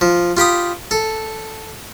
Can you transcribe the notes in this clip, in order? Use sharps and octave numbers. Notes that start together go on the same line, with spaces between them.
F3
F4 G4 B5 D#6
A4